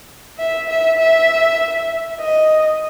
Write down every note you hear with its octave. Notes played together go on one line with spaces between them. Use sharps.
E5
E5
E5
D#5